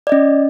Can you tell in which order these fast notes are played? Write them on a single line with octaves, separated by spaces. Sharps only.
D5 D#5 C#4